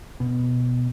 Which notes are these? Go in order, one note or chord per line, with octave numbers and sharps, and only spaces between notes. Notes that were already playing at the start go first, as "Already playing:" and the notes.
B2